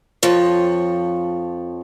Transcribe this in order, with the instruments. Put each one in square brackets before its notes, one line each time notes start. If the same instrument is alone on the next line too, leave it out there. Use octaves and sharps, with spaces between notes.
[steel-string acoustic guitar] F2 F3 C#5